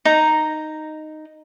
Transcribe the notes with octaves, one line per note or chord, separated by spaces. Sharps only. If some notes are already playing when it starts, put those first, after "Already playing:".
D#4 A#5